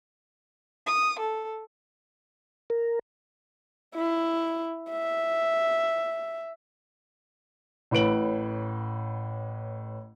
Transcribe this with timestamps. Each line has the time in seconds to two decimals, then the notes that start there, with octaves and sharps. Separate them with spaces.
0.87 D#6
1.19 A4
2.70 A#4
3.95 E4
4.91 E5
7.91 A1 A2 B4 D7 F#7